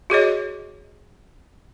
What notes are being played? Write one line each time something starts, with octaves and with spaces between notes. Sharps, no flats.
F#4 G#4 C#5 D#5